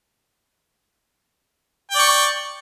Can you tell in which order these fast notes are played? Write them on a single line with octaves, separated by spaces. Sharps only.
G5 D5 C#6